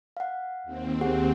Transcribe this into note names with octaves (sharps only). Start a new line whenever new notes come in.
F5 F#5
D#2 C4
G4 G#4 F#5